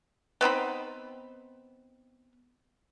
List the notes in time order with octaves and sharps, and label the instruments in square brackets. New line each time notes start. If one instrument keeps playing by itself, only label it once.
[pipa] B3 C4 D#4 B5